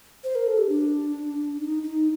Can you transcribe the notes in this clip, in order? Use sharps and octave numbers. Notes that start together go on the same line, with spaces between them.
C5
A#4
A4
G4
D4
D#4
D#4